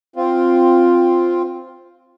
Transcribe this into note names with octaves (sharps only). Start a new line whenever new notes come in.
C4 F4